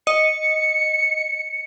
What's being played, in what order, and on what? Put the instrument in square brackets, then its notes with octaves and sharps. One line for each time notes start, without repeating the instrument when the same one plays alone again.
[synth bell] D#5 [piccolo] C#7